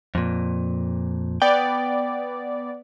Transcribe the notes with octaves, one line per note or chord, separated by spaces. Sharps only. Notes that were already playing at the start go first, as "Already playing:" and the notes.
F2 A#2
B3 D5 G5